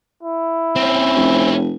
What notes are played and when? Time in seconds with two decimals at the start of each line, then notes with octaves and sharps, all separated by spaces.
0.23 E4
0.76 C4 C#4
1.16 F1